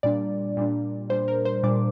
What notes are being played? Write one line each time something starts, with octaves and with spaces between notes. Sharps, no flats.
A#2 G3 D4 D5
A#2 G3 D4
A#2 G3 D4 C5
A#4
C5
A#2 G3 D4 D6